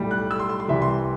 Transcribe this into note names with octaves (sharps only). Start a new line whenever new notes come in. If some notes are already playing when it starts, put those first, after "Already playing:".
Already playing: B1 A2 G3
F#6
E6
C6
C6
C6
C2 C3 E3 G3 E5
C6